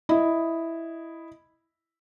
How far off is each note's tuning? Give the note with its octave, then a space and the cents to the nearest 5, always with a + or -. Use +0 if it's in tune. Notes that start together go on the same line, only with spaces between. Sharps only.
E4 +0 D#5 +0